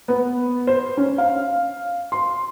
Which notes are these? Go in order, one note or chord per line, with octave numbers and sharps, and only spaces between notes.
B3
C5
C#4
F5
C6